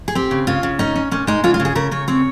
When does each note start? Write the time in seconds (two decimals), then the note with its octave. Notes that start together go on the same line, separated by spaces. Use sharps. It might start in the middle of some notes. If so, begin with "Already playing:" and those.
0.08 G#4
0.15 C4 G4
0.31 C#3
0.47 C#3 F4
0.63 C#3
0.79 C#4 D#4
0.96 C#4
1.11 A#2 C#4
1.27 G#3 D#4
1.44 C#3 F4
1.54 F4
1.60 C#3
1.65 G#4
1.75 C#3 A#4
1.91 C#3 C#5
2.08 C4 C#5